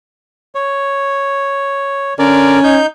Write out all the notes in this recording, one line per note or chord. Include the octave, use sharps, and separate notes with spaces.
C#5
D3 C#4 A#4 D5
D#4 G6